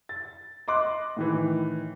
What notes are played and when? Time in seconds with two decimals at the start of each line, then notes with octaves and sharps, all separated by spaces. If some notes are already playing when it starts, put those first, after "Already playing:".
0.09 A6
0.68 D#5 C6 D6 F#6
1.17 A2 D#3 E3